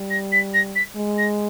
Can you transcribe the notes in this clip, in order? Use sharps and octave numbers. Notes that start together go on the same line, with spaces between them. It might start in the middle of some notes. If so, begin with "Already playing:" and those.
Already playing: G3
A#6
B6
A#6
B6
G#3
A#6